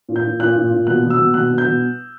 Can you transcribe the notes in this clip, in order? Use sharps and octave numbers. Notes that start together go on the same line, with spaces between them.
A#2
G6
A#2
A#2 F#6
A#2
A#2
B2 F#6
B2
E6
B2
B2 F#6
B2
G6
B2